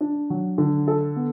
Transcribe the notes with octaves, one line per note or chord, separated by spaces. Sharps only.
D4
F#3
D3
A4
B3